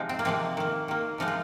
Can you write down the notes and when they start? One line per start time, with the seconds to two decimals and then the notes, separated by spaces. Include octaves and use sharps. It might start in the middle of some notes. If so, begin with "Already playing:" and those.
Already playing: C3 F3 G#3 D#4
0.09 C4
0.19 A#3
0.25 C3 F3 G#3 C4
0.57 D#3 A#3
0.88 D#3 A#3
1.18 C3 F3 G#3 D#4
1.28 F4